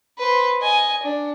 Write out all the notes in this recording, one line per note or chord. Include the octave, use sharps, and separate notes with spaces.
B4 C5
D#5 G#5
D4